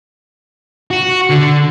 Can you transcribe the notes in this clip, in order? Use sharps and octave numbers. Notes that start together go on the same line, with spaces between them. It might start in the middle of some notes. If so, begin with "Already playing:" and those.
F#4
D3